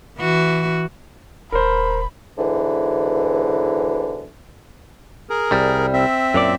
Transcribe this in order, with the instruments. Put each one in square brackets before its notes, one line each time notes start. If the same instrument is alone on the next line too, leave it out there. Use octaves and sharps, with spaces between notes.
[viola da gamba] E3 F#4
[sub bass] D#1 [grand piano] A#4 C5 [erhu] B5
[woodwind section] D#2 G#2 B2 D3 E3
[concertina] G#4 A#4
[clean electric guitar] C2 G3
[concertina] C4 E5
[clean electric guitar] F#2 A#2 D5